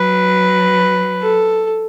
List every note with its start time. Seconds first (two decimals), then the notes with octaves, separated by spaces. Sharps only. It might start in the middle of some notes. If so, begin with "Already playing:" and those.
Already playing: F#3 B4
1.22 A4